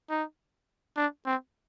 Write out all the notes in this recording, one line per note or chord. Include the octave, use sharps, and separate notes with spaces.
D#4
D4
C4